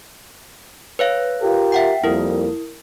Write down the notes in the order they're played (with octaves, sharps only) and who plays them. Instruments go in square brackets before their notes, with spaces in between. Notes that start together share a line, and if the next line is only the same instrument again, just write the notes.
[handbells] B4 C#5 F5
[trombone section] F4 G4 A#4
[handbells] E5 F#5 G5
[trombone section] F2 G3 A#3 [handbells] E4 A#4